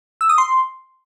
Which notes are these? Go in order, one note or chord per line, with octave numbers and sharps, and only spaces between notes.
E6
D#6
C6